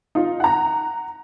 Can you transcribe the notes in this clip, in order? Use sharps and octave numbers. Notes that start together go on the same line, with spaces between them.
D#4 F4
F#5 A#5